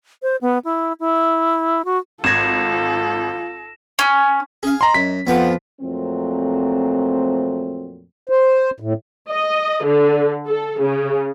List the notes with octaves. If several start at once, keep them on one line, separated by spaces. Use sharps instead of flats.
C5
B3
E4
E4
F#4
G#1 F4 A4 G#6 A#6 E7
C#4
C#4 G#4 F5
D#5 A#5 C6
F#2 B6
F2 F3 B3 B4 F#5
F2 A#2 F#3 A3 C4
C5
A2
D#5
D3
A4
C#3